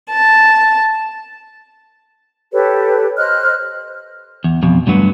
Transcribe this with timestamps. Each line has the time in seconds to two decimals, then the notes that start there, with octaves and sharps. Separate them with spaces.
0.11 A5
2.52 G4 A4 B4 C#5
3.17 C5 D#5 F6 F#6
4.44 E2
4.63 F2 B2
4.87 D2 G2 D3 F#3 B3